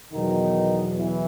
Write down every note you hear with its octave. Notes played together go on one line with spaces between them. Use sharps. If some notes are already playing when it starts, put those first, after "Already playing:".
E2 B2 D#3 F#3 D#4
E3 E4